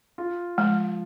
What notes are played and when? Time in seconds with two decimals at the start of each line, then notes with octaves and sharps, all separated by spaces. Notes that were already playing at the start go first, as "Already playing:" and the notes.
0.18 F4
0.58 F3 G#3